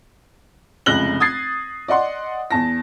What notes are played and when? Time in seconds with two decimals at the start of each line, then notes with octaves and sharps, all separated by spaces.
0.86 F1 C#2 F#6 A#6 F#7 G7
1.20 D#6 G#6 A6 C7
1.88 D5 D#5 F#5 C6
2.51 E2 A5 A#6